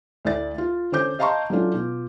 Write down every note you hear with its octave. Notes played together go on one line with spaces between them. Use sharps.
D2 E4 D5 A6
F4
D3 C#4 C5 D6 G6
D#5 F5 A5 A#5 C6 C#6
F#3 A3 C#4 D4 F4
B2 F4